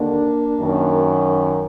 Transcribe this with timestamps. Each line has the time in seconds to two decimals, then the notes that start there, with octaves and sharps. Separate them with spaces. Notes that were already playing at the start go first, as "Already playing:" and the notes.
Already playing: D#2 D3 A#3 D4
0.59 F#2 D#3